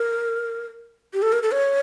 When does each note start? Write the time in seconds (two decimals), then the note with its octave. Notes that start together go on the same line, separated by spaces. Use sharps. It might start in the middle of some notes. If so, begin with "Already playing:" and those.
Already playing: A#4
1.13 G4
1.22 A4
1.32 A#4
1.43 A4
1.53 C#5